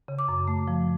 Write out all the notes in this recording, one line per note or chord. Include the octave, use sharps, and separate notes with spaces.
C#3
D6
F#2
A3
F3